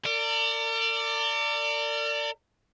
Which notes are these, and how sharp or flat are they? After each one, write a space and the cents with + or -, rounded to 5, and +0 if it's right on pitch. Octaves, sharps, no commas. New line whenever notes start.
A#4 -45 D5 +0